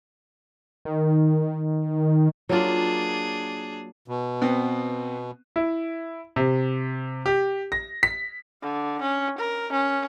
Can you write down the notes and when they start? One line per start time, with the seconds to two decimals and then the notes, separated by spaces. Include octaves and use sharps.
0.85 D#3
2.49 F#3 A#3 D4 F4 G#4
4.08 B2
4.42 B3 C4
5.56 E4
6.36 C3
7.26 G4
7.72 A#6
8.03 B6
8.62 D3
9.01 C#4
9.38 A#4
9.72 C#4